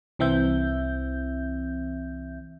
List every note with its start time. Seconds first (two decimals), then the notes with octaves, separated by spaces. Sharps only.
0.19 C2 E3 C4 E5 G6